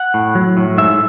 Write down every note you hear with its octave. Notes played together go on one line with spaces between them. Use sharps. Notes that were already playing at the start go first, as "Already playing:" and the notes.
Already playing: F#5
A2
F#3
A2
G#2 E5